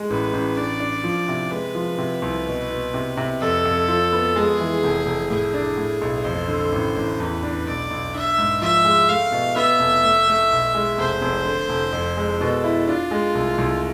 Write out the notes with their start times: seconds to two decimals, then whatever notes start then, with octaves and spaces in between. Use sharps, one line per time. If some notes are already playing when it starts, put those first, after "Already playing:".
Already playing: G#3
0.10 A1 B4
0.33 A1
0.56 D4 D5
0.80 D4
1.04 F3
1.28 C3
1.51 G#3 B4
1.75 F3
1.98 C3
2.22 C2
2.47 B2
2.70 B2
2.94 C3
3.17 C3
3.40 F2 A4
3.65 F2
3.88 F3
4.13 B3
4.36 G#3 G#4
4.60 E3
4.84 F1
5.06 F1
5.30 A2 G#4
5.54 D4
5.78 A2
6.01 B1
6.25 F2 C5
6.48 D3
6.72 A1
6.97 A1
7.20 E2 B4
7.43 D4
7.67 B1 D5
7.91 B1
8.15 D4 E5
8.38 G#2
8.61 F3 E5
8.85 G#3
9.09 A3 F5
9.32 B2
9.56 B3 E5
9.79 F1
10.04 A3
10.28 A3
10.51 B1
10.75 G#3
10.98 F1 C5
11.21 F1
11.45 D3
11.69 F1
11.92 F2
12.17 G#3
12.41 B2 A4
12.64 E4
12.87 D4 F4
13.11 G#3
13.35 C2
13.58 C2